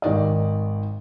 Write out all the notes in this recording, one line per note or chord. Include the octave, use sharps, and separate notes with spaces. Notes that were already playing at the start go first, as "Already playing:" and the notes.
G#1 D#3 D5 D#5